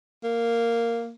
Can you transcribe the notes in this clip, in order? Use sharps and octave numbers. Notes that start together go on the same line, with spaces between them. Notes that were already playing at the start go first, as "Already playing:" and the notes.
A#3